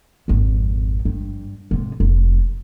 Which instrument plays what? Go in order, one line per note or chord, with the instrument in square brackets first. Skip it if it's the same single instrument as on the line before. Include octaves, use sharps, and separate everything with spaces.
[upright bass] G#1 F2
G2
G#2 C3
F1